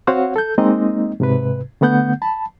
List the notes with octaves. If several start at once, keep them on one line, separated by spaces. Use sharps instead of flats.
C4 F#4 C5 C#5 F5 F#5
A4 G6
G#3 A#3 C4 D#4 D#5
G#2 C3 B4
D3 A3 B3 F#5 G6
A5 B5